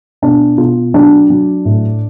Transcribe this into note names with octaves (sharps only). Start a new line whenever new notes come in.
B2 D4
B2 F4
F#3 D4
F#3
A2